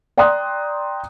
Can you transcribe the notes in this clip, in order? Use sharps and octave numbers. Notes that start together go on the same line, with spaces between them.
D5 G5 A#5 C6 D#6 F#6